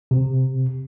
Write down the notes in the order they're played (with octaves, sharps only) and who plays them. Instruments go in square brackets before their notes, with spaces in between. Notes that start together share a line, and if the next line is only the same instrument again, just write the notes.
[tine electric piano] C3